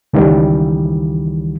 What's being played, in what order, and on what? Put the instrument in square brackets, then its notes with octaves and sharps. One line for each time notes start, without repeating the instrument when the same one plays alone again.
[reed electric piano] C#2 D#3 E3 G3